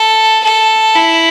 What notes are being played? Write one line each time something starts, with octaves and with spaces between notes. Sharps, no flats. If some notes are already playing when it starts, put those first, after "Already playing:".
Already playing: A4
A4
E4